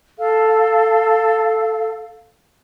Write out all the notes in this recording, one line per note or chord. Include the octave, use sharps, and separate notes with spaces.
A4 F5